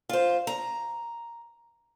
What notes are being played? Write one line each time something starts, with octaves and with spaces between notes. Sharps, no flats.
F4 C5
A#5